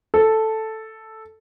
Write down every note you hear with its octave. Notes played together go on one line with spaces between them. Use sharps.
A4